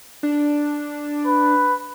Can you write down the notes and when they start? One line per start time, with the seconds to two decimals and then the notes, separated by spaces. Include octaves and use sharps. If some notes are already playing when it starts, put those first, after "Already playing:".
0.23 D4
1.26 B4